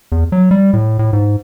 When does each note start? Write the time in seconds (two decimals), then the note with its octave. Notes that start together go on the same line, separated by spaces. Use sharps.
0.12 E2
0.32 F#3
0.51 G3
0.73 A2
0.99 A2
1.13 G#2